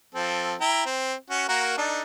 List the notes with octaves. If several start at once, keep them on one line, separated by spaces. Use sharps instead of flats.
F3 C4 A4
E4 G5 A#5
C4
C#4 F#4
A#3 F#4 A#4
D4 D#4 A4